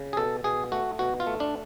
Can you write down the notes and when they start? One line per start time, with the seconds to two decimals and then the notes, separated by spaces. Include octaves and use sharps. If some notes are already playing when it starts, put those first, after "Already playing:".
Already playing: C#3
0.13 G#4
0.17 B2 A4
0.44 B2 G#4
0.72 A3 F#4
0.99 B2 F#4
1.20 F4
1.27 A3
1.40 D4